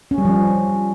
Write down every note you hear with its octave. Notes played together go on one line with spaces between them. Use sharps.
C#4
G3
F3